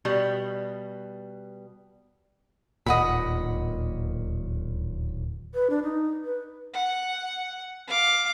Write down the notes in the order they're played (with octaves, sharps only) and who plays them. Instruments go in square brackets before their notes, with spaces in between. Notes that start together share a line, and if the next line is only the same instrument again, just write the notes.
[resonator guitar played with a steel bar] B2 G3
[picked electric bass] D1 D#2 A#2 [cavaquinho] D#5 F#5 B5
[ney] B4
D4
D#4
B4
[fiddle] F#5
F5 D6